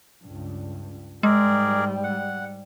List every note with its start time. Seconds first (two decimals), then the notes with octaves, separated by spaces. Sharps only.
0.24 C#2 G2
1.23 G#2 G3 G#3 G#4 A#4 D5
2.04 F#5